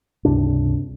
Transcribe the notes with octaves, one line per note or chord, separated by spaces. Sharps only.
C#2 G2 C3 D4